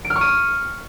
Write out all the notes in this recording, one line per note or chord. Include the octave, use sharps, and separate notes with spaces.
D7
F6
C#6
D#7